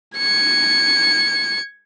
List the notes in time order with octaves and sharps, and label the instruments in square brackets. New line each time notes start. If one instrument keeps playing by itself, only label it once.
[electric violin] G#6 C#7